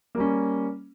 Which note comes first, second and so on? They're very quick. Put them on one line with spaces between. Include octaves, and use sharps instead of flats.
A#3 G3 C#4